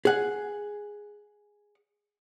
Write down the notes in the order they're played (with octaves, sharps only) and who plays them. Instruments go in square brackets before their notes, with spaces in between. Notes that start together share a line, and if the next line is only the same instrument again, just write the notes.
[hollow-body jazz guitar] G#4 F#5